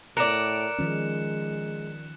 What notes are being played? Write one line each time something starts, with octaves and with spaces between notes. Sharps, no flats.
A2 A#4 D5 F#6 C#7 E7
D#3 F3 G#3 C#4